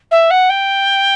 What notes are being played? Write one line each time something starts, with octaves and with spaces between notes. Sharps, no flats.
E5
F#5
G5